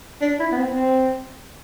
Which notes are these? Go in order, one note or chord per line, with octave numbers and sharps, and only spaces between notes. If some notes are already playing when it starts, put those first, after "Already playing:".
D4
E4
B3
C4
C4